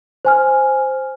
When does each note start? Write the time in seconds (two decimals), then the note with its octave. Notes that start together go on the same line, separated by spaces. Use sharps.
0.25 C5 G#5 F6